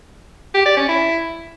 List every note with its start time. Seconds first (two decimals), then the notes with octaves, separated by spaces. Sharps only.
0.54 G4
0.66 D5
0.77 C#4
0.89 E4